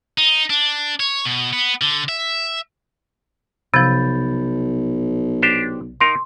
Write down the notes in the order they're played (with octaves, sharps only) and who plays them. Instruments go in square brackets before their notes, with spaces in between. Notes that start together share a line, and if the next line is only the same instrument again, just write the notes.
[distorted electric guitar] D#4
D4
C#5
B2
B3
D3
E5
[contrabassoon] B1 [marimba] C3 F3 [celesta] B5 G6 A6
[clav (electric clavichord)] D4 G4 C5
[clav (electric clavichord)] D#4 A#4 F5 [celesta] C6